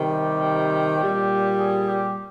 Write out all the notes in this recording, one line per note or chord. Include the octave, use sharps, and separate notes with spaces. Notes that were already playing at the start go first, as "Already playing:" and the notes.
Already playing: C3 D#3 G3
G4
A#2 G3
G#4
G4